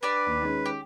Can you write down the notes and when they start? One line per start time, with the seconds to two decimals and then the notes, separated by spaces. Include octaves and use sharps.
0.03 D4 G4 B4 D5
0.27 D#2
0.42 D#3 G#3 C#4
0.66 G4